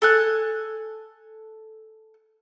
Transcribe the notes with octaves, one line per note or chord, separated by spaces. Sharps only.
A4 G#5 F#6